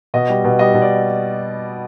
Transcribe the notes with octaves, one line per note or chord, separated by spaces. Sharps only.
B2 D#5
G3
B2
G3 D#5
B2
D5